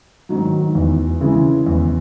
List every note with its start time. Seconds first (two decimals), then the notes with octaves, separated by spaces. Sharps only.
0.29 G#2 D#3 F#3
0.75 E2
1.21 C#3 E3 G#3
1.66 E2